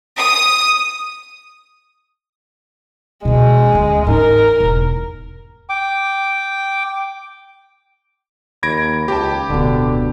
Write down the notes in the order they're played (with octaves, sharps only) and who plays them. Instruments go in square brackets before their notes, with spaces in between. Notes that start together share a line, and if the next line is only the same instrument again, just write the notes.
[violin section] D#6
[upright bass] B2 D4 [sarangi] G#3
[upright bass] D2 C#4
[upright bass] G#2 D#4 [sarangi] A#4
[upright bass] E1
[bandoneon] G5 D6
[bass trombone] D#2 [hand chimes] B5 [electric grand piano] G#6 A#6 D7
[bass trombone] C#2 [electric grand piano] G4 G5 A5
[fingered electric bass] D1 B2 [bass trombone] D3